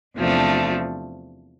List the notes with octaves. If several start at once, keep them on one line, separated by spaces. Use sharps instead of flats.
E2 C3 F3 A3 D4